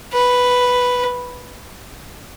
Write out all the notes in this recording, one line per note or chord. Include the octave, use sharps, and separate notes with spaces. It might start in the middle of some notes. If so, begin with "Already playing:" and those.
B4